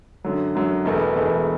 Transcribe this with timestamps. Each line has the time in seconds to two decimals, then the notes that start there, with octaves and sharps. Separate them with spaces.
0.24 F#2 D3 F#3
0.55 F#2 D3 F#3
0.85 E1 E2 B2 A3
1.16 E1 E2 B2 A3